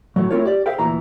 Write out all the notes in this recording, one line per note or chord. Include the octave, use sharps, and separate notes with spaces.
A2 F#3
A3 C4 E4 F4 A#4 C#5
G4 D5
G#4 C5 E5 F5 G5
D2 A#2 E3 A#5